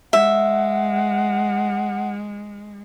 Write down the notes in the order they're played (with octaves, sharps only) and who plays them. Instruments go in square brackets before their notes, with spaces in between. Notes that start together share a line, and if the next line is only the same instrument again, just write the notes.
[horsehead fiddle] G#3 [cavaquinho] E5 [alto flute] F#5